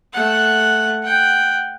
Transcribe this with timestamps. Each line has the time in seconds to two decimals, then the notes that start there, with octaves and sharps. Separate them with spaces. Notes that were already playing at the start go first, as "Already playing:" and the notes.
0.13 A3 F#5
1.03 F#5 G5